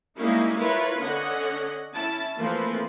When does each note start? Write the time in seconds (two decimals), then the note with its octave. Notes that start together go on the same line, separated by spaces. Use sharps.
0.18 G3 G#3 A#3 C#4 D#4 E4
0.57 E4 F4 A#4 B4 C#5
0.98 D3 C#4 D#5 F#5
1.94 C#4 E4 A5
2.38 E3 F3 A3 A#3 C4 B4